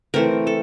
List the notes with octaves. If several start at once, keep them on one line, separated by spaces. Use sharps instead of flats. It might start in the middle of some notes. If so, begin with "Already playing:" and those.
E3 A3 C4 A#4
A4